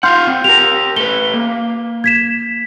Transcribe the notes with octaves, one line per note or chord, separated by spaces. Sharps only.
F4 F5 F#5 C6 F6 G6
C4
G4 A#4 F7
A3 B4 G7
A#3
G#6 B6 E7